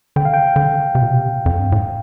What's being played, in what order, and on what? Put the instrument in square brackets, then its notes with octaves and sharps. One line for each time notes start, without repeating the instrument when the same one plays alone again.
[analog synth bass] D3 [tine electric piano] G5
[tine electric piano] F5
G5
[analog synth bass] D3
C3
A#2
C3
F2
G2
A2